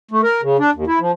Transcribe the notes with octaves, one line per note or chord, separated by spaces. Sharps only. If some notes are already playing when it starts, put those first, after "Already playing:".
A3
A#4
C#3
D4
D#2
E4
F3